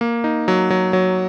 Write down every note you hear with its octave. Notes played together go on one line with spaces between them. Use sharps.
A#3
D#4
F#3
F#3
F#3